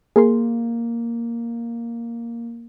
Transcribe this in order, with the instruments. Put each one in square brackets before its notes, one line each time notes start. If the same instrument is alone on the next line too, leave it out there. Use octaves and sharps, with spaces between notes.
[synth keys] A#3 [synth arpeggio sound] G#4 A#4 C6